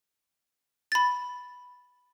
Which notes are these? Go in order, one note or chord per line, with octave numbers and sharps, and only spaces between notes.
B5 A6